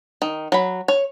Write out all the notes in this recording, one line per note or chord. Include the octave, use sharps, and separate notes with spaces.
D#3
F#3 B5
C#5